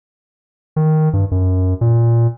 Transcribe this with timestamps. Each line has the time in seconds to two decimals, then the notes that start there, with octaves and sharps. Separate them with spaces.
0.76 D#3
1.13 G2
1.31 F#2
1.81 A#2